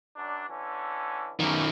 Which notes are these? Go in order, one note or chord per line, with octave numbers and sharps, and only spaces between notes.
F#2 D4
D3 E3 C#4
F#2 D#3 E3 A3 A#3